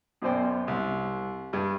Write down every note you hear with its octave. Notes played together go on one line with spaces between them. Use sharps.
F#2 B2 C#4 C5 D5 G5
C2
G2